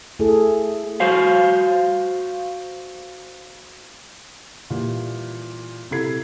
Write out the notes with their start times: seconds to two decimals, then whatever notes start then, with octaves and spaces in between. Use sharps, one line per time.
0.19 A3 E4 G#4 A4
1.00 F#4 C5 F5
4.70 A#2 E3 G3
5.91 C3 E4 A4 G#6 C7